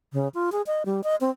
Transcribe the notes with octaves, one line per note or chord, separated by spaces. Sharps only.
C#3
F4
G#4
D#5
G3
D#5
C4